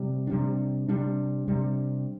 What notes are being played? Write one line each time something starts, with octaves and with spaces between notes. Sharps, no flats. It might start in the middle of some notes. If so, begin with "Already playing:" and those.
Already playing: C3 G3
C3 G3 D4
C3 G3 D4
C3 G3 D4